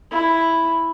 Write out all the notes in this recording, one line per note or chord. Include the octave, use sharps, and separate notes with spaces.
E4